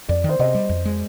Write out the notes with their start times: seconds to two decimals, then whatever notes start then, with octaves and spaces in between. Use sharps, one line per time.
0.09 F2 D5
0.24 D#3
0.29 C5
0.39 C3 D#5
0.55 G3
0.69 F2
0.85 G#3